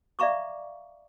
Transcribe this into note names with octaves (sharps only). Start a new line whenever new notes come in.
D5 E5 F5 A#5 C#6 D6